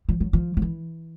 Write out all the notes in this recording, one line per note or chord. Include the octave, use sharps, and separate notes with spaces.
F3
F#3
F3
F3
E3